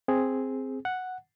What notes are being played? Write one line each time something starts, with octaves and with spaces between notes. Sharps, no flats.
C4 G#4
F#5